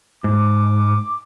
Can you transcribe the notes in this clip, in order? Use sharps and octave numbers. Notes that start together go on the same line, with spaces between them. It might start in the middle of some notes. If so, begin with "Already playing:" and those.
G#2 D6